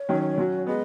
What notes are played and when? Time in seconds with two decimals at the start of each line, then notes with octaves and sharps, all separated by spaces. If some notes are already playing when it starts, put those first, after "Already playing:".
Already playing: C#5
0.09 D#3 F#3 C#4
0.38 F#3 C#4 F#4
0.67 G#3 B3 D#5